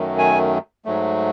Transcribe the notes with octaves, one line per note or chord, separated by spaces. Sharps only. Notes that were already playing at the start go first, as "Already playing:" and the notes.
Already playing: F#2 D#3 F#3 A3
G#5
G#2 F#3 A3